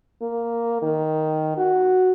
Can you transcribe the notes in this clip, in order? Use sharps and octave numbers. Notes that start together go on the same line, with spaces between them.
A#3
D#3
F#4